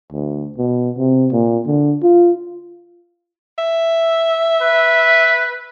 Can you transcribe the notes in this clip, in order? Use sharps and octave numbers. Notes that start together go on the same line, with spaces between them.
D2
B2
C3
A#2
D3
F4
E5
B4